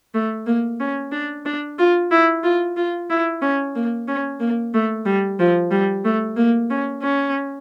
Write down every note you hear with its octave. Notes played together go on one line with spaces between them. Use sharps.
A3
A#3
C#4
D4
D4
F4
E4
F4
F4
E4
C#4
A#3
C#4
A#3
A3
G3
F3
G3
A3
A#3
C#4
C#4